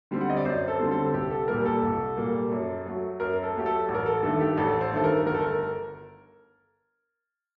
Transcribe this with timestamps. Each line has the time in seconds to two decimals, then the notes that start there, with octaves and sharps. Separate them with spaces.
0.11 D3 G3 C4
0.21 F#5
0.30 D#5
0.37 D5
0.45 F#2 C5
0.68 A4
0.80 D3 G3 C4
0.91 A4
1.14 C2 G4
1.31 A4
1.48 A#2 G3 A#3 A#4
1.66 A4
1.82 C2
2.17 A#2 G3 A#3
2.51 F#2
2.86 F#3 A3
3.20 F#2 A#4
3.43 A4
3.54 F#3 A3 G4
3.66 A4
3.89 A1
3.94 A#4
4.06 A4
4.23 G2 D#3 A3 A4
4.40 G4
4.57 A1 A4
4.81 C5
4.92 G2 D#3 A3 A4
5.04 A#4
5.26 G1 A#4
5.34 A4
5.42 A#4